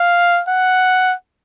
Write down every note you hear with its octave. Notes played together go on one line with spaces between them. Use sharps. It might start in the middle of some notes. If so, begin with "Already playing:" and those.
Already playing: F5
F#5